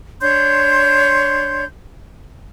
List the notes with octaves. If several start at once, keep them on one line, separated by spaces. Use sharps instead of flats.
D4 C#5 C6 G6